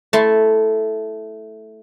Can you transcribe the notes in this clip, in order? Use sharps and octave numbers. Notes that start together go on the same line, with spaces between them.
A3 E4 A5 C6